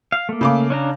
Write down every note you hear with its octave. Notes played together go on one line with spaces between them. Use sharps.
F5
A3 A#3
C#3 F5 D6
C#4 D4 A#5